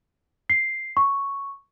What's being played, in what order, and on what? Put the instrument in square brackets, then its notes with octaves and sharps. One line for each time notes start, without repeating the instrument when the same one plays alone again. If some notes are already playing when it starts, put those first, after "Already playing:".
[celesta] C7
C#6